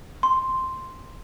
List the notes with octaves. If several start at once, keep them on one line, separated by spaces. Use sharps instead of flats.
C6